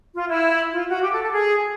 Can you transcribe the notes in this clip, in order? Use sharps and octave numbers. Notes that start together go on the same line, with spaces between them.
F4
E4
F4
F#4
G4
A4
A4
G#4